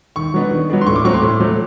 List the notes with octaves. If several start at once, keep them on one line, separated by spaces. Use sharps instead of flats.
D#3 C#6
F#3 B3 D4
D#3
F#3 B3 D4
C6
A2 C#6
D6
F#3 A3 C4 C#6
C6
A2
F#3 A3 C4